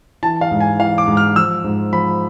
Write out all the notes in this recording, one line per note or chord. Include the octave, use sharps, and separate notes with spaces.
E3 A5
F5
G#2
G#5
E3 F5
D6
G#2
F6
F3 E6
G#2
F3 B5